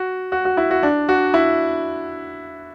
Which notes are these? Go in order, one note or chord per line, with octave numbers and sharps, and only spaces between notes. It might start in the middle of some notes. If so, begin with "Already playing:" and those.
Already playing: F#4
F#4
F#4
E4
F#4
D4
F#4
E4